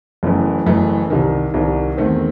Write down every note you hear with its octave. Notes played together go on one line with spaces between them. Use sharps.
F#1 F#2 E3 A3
F#1 F#2 E3 A3
C2 C3 D#3
C2 C3 D#3
E2 D#3 A3 C4